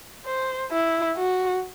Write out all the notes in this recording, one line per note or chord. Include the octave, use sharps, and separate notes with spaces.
C5
E4
F#4